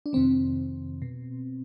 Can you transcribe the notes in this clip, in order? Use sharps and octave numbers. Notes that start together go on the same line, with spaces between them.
D4
F2 C3 D#3 C4
B2